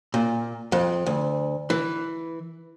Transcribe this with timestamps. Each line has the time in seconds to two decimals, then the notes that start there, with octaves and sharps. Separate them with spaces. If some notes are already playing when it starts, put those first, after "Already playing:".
0.14 A#2
0.72 F2
1.06 D2
1.70 E3